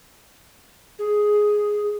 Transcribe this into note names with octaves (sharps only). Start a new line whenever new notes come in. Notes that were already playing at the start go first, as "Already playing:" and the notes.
G#4